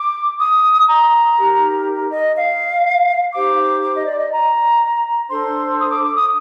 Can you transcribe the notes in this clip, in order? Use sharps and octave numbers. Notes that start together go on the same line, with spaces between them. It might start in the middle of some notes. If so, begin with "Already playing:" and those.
Already playing: D6
D#6
A#5
D#4 G4 A#4
D#5
F5
D#4 G4 C5 D6
D6
D#5
D5
D#5
A#5
D4 A4 C5 C6
D#6
D6
D6
D#6